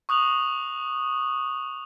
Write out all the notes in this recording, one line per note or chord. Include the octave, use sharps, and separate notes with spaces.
C#6 D#6 F#6 F7 F#7